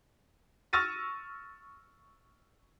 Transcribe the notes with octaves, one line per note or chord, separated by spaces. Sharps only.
C#6 E6 F6 A6 A#6 D#7